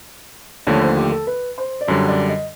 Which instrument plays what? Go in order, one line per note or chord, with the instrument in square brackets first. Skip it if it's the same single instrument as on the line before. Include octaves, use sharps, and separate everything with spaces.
[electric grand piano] D#2 D3 F3 A3 [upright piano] C#5
[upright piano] C5
G4
A4
B4
C5
D5
[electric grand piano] F#2 D3 G3 [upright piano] C#5
[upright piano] D5
D#5